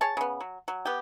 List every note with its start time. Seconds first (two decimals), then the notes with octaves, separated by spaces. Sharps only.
0.01 G#4 C#5 A5
0.17 C#3 B3
0.40 F#3
0.68 F#3
0.85 B3 G4